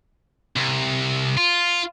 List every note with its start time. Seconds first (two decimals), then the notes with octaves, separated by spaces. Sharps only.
0.56 C2
1.37 F4